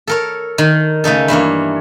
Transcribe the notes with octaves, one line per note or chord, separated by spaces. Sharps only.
A4 A#4 C#5
D#3
C#3 A3 D#4 A4
G2 E3 A#3 C#5